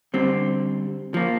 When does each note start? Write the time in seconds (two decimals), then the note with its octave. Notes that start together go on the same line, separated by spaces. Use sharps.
0.14 D3 G3 C4
1.14 F3 A#3